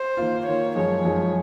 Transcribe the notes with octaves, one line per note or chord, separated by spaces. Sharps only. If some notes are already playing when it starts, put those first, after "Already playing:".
Already playing: C5
D#3 A#3 F4
D#3 A#3 F4 C#5
F#2 F3 G#3 D#4 C#5
F#2 F3 G#3 D#4